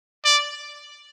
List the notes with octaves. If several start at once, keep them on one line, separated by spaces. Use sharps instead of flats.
D5